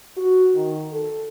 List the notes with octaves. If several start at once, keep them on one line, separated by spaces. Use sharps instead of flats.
F#4
D#3
A4